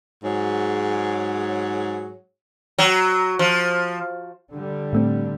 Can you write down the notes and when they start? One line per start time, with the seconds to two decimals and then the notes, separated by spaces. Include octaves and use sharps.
0.24 G#2 F#3 G#4 C#5
2.79 F#3
3.39 F3
4.53 D3 G3
4.93 A2 A3 C4